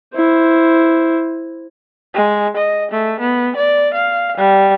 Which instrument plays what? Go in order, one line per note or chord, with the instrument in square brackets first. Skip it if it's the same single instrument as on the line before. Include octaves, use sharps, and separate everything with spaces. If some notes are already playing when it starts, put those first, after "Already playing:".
[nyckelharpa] E4 C5
[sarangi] G#3
D#5
A3
B3
D5
F5
G3